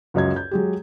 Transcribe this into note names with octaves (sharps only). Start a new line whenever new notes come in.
C#2 F#2 D#5 G#6
G6
F#3 G#3 G4